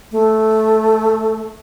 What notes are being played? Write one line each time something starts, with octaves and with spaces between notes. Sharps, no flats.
A3